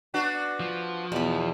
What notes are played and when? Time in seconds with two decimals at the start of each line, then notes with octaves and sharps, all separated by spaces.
0.14 B3 D4 F#4
0.60 F3
1.12 E2 B2 B5